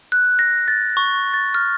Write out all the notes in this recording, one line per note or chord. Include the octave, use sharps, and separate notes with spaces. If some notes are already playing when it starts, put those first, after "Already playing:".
F#6
A#6
A6
C#6
A6
F6